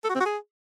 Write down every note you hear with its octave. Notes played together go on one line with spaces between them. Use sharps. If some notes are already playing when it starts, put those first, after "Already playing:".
A4
F#4
C4
F#4
G#4